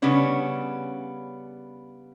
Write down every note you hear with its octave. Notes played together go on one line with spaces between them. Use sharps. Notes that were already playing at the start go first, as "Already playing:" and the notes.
C#3 G3 B3 C#4 D4